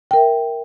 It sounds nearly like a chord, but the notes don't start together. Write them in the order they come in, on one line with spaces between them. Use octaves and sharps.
G5 A#4 E5